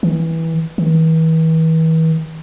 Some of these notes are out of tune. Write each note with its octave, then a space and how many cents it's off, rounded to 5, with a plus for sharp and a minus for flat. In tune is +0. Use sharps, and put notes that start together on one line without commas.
E3 -15
E3 -40